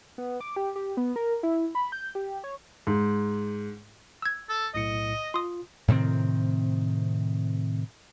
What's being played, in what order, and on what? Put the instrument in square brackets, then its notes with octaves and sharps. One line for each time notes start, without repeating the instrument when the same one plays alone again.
[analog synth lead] B3
D6
G4
G4
B3
A#4
E4
B5
G6
G4
C#5
[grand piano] G#2
[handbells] E6 G#6
[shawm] A4
[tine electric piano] B1 A2 C#7 [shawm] D#5
[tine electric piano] F4 [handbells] C6 D#6
[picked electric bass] A2 C3 D#3 C4